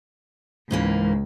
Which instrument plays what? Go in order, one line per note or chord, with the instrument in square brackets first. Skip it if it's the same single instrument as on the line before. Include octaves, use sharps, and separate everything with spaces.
[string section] C#2 [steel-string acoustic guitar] G#2 E3 A#3